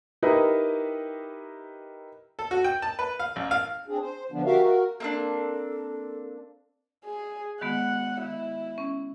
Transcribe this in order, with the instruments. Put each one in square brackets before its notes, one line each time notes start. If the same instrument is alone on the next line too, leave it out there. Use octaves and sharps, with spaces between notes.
[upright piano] D#4 E4 G4 A#4 B4 D#5
[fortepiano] A4
F#4
G5
A5
B4
F5
A1
F5
[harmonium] C4 D4 G#4
C5
D3 F3 B3 D4
F#4 G4 A#4 E5 F5
F#4 A#4
[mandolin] A#3 C4 D4 [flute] A4
[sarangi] G#4
[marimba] D#3 G#3 B3 [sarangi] F#5
[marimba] D#3 [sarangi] E4
[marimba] C#4